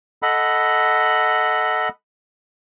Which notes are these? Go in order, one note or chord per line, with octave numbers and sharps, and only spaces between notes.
A4 D#5 F#5 B5